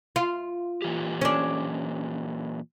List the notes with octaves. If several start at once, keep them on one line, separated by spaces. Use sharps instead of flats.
F4
A#2 E3 G4
C#4 D4